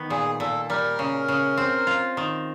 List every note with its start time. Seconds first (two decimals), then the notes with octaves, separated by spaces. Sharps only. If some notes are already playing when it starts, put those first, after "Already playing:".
Already playing: D#3 B3
0.10 A#2 G#4
0.40 A#2 A4
0.70 G3 A#4
0.99 C#3
1.28 C#3
1.57 C4
1.87 F4
2.17 D#3